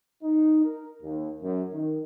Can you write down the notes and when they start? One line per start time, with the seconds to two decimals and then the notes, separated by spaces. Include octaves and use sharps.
0.23 D#4
0.64 A#4
1.03 D#2
1.42 F#2
1.72 D#3